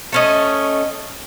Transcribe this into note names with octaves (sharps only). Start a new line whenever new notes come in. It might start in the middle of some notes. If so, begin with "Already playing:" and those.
A3 C#4 D#5